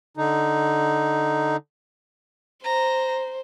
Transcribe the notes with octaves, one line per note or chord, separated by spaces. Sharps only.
D3 D#4
C5 A#5